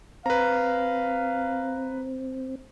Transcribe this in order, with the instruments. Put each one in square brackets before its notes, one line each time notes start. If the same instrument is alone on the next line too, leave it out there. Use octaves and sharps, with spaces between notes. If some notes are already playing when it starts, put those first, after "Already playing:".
[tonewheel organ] C4 [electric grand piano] B4 A#5 [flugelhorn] F5